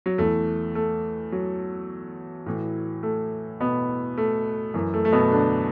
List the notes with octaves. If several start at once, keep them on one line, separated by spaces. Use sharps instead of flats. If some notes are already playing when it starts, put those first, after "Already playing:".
F#3
E2 E3 A3
A3
F#3
A2 E3
A3
B2 B3
A3
F#2 E3
A3
A3
B2 B3
D3 D4